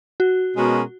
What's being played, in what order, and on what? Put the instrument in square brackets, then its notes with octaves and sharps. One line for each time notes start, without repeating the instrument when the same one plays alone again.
[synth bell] F#4
[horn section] B2 G#3 C#4 F#4 A#4